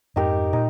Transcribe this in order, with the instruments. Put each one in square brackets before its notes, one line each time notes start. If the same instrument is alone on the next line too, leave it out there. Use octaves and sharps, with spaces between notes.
[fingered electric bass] F2 G#2 [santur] D#4 G4 A#4
[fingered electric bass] A#2 [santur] D#4